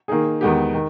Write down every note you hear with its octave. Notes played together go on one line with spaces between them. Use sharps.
D#3 A#3 D#4 G#4
E2 D#3 G#3 B3 G4
D#3